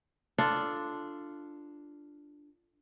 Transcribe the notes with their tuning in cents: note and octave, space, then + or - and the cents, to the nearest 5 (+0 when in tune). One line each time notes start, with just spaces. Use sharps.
D4 +0 F4 -15 A4 +0